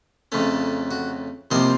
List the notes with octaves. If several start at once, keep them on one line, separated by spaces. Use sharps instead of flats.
F2 C#3 A3 C#4
F#4
C2 C3 F3 A#3 D#4 C5 D#5